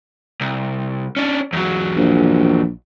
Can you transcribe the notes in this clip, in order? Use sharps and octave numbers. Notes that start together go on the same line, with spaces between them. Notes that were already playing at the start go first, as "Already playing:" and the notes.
C2
C#4 D4
E2 F#3
A#1